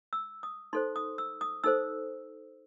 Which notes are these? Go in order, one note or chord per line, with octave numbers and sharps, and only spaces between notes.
E6
D#6
D#4 A4 C5 C6
D#6
E6
D#6
D#4 A4 C5 E6